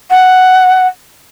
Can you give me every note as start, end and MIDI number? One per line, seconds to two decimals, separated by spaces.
0.10 0.86 78